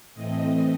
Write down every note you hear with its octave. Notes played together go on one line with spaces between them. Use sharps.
A2 E3 A3 C4 D#5